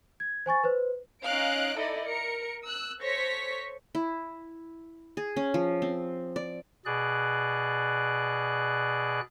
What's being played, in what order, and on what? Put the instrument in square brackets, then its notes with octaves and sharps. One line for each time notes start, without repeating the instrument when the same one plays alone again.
[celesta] G#6
C5 G#5 C#6 A6
B4 C5
[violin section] C#4 D#4 D#5 F5 F#6 D7
D#4 E4 A4 D5 D#5
A#4 C#7
E6 F#6
A4 C5 C#5 C#6 A#6 B6
[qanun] E4
G#4
C#4
F3
C4
D5
[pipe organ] B2 G#4 D5 F#6